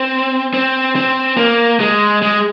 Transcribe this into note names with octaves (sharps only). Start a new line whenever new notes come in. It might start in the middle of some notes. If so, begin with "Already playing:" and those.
Already playing: C4
C4
C4
A#3
G#3
G#3